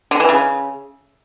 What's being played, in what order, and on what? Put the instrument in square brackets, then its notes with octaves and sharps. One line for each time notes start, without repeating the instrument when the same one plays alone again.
[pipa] D3
E3
C#3